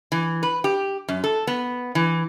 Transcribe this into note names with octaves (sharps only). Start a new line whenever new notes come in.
E3
B4
G4
F#2
A4
B3
E3